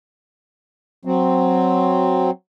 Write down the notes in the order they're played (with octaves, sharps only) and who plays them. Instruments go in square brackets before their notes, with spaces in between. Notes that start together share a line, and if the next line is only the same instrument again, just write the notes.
[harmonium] F#3 C4